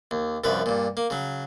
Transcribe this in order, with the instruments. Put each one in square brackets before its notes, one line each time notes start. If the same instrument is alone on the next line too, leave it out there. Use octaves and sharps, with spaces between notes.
[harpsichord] D#2
C2 F#2 F3 B4
G2 A#2
A#3
C#3 F#3